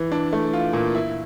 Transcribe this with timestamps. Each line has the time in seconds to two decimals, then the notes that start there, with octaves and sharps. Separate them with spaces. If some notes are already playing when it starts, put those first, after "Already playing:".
Already playing: E3
0.12 D4
0.33 A3
0.53 F4
0.73 A#2
0.95 E4